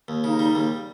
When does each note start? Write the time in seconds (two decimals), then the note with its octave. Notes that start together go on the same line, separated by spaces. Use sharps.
0.08 D#2
0.23 C#3 D#4
0.39 G3
0.55 D#2